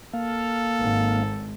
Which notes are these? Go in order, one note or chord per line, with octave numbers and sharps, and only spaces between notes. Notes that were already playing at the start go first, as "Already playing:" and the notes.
A#3 A4 F5
G#1 G#2